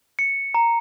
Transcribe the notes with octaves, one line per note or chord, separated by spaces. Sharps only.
C#7
A#5